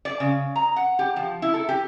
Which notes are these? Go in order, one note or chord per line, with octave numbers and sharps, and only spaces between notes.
D5
C#3
A#5
F#5
G4
F3
E4
A4
G4